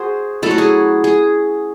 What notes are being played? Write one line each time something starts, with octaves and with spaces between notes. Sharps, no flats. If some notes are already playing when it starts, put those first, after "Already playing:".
Already playing: F#4 G#4 C5
F#3 A3 C#4 E4 A4
F#4
G#4
G#4